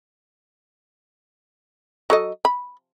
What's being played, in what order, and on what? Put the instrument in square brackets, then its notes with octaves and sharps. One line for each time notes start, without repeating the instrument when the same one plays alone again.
[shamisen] F#3 A4 D#5
B5